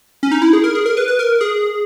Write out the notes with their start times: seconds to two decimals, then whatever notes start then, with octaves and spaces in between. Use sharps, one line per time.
0.23 C#4
0.31 D#4
0.42 E4
0.53 G#4
0.64 A#4
0.75 G#4
0.86 A#4
0.97 B4
1.08 B4
1.19 A#4
1.41 G#4